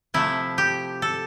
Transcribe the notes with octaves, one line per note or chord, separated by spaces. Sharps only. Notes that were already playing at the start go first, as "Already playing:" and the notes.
C3 F3 A3 E4
G4
A4